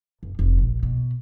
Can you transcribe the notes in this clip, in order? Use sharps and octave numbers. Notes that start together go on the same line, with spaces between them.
F#1
F1
A#1
B2